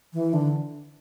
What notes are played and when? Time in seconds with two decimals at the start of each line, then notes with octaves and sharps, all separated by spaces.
0.13 E3
0.33 D3